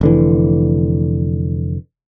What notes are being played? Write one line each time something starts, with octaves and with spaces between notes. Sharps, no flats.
F1 D3 E3